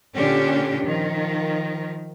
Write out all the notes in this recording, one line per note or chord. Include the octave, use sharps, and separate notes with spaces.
A#2 D3 C#4 D4 G4
D#3 F3